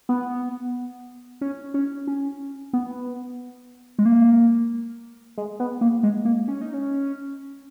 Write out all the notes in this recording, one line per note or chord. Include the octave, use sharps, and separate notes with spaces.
B3
C#4
C#4
C#4
B3
G#3
A#3
G#3
B3
A#3
G#3
A#3
C#4
D#4
C#4